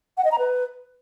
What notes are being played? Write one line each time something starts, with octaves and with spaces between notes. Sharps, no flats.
F#5
D#5
A#5
B4